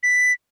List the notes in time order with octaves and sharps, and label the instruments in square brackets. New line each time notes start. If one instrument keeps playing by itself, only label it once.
[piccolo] B6